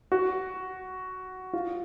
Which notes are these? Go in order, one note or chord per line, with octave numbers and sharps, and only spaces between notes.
F#4
F4